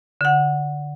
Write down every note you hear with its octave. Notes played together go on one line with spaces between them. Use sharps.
D3 F#5